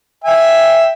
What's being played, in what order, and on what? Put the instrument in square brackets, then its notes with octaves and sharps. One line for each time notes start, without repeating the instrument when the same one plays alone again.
[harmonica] E5 G5 G#5